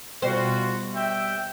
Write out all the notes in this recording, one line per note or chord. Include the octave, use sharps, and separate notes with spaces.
B2 G3 F4 F#4 C5
E5 G5